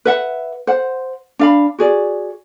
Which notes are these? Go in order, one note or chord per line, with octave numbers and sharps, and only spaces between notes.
B4 E5 F#5
C5 F#5
D4 F5 B5
F#4 G#4 D5